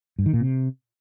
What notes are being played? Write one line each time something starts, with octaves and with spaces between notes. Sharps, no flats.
G2
D#3
A#2
C3